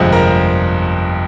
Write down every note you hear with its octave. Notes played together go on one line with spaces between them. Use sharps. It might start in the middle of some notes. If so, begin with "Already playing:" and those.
Already playing: G1 F2 C3 F3 G#3
A#4 A#5